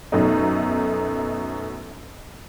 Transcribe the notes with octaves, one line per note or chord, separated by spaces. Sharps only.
F#2 B2 A3 D#4